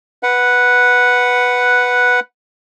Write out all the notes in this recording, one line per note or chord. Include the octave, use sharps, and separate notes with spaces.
B4 F#5